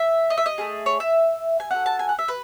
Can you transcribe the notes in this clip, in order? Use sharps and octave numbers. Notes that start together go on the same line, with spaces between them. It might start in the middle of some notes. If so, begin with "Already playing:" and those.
Already playing: E5
D#5
E5
D#5
A3 C#4 G#4
C#5
E5
G#5
C#4 F#4 A4 F#5
A5
G#5
F#5
E5
B4